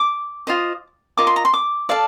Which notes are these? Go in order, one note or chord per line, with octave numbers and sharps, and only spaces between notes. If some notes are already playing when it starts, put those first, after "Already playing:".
Already playing: D6
F4 C5 D#5
F4 A#4 D#5 D6
C6
A#5
C6
D6
A4 D5 F5